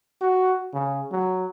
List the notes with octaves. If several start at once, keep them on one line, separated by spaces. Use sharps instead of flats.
F#4
C#3
F#3